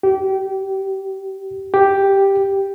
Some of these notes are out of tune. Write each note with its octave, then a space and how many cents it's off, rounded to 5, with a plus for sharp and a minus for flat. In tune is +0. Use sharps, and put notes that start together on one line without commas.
G4 -25
G4 +0